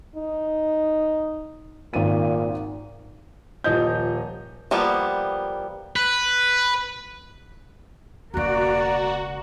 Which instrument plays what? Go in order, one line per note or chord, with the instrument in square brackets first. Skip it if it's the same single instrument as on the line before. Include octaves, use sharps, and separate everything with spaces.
[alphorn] D#4
[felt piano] G#1 D#7 [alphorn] A#2
[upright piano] D#1 F3 D#5 G6
[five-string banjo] F3 G3 A#3 B3
[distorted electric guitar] B4
[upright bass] E1 C#3 [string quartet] A#3 D5 [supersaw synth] F#4 [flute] A#5